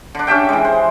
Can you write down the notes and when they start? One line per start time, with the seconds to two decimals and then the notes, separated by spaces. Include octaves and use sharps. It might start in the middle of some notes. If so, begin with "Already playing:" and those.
0.15 D3 D4
0.27 C#4 G4 E5 G5
0.49 E3 G#3
0.65 C5